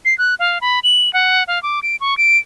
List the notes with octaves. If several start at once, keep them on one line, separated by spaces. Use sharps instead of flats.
C7
F#6
F5
B5
F#7
F#5
F5
D6
D7
C#6
D7